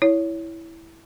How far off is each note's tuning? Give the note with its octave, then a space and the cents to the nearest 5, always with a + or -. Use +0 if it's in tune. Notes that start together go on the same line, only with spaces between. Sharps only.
E4 +0 C#5 +20